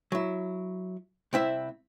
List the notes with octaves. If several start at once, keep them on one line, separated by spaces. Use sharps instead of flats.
F#3 E4
C2 C4 E4 E5